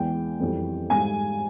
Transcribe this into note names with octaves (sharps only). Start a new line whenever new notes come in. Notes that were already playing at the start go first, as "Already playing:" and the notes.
Already playing: E2 E3 G#3 G5
F2 E3 G3
G#2 G3 G#5